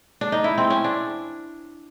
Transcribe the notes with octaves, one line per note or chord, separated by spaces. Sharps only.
D4
D#4
E4
C4
C#4
D4